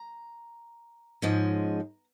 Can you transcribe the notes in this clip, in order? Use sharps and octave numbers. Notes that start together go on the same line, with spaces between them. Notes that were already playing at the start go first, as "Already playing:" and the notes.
Already playing: A#5
G#2 F3 G#3 C#4